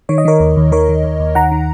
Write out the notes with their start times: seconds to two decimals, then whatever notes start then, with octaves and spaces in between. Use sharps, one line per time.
0.09 D#3 C#5
0.18 D#5
0.25 D#3 A#4 C#5
0.40 D#2
0.56 D#2
0.72 D#3 A#4 C#5
0.89 D#3
1.04 D#2
1.20 D#2
1.35 D#3 F#5 A#5
1.51 D#3